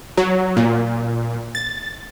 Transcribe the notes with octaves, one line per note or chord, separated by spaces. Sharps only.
F#3
A#2
A6